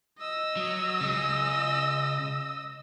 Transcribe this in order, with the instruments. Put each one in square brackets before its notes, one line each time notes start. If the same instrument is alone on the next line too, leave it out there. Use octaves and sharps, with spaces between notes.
[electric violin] D#5 E6
[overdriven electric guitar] F#3
C#3 G#3